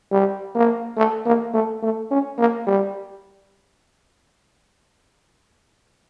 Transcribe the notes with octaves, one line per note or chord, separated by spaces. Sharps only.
G3
A#3
A3
A#3
A3
A3
C#4
A#3
G3